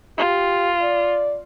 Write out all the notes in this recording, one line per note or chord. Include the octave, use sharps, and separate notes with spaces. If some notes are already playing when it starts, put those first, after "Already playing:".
F4 G4
D5